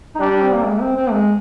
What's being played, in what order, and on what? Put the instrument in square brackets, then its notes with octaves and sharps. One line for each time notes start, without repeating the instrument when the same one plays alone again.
[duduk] D#4
[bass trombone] G3 [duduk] D4
[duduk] D4
C4
A#3
G#3
C4
C4
G#3